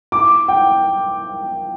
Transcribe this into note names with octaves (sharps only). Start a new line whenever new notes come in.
D6
G5